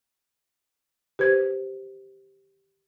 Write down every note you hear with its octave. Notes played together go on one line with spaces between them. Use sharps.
G4 B4 C5 G#6